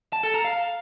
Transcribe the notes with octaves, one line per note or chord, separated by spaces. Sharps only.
A5
A4
A#5
F5